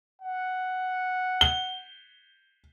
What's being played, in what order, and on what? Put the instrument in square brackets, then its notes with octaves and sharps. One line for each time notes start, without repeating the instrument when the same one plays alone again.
[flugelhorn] F#5
[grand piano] G7